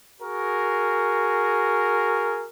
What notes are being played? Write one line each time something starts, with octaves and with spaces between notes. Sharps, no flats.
F#4 G#4 A#4